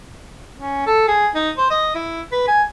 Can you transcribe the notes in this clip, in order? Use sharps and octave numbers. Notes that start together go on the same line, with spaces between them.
C#4
A4
G#4
D#4
C5
D#5
E4
B4
G#5